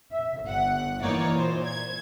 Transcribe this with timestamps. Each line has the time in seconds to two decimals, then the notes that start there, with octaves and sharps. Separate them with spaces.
0.12 E5
0.44 G1 F#5
1.03 E3 A#3 D#4 C#5 D5
1.36 A#2 C5
1.65 G#6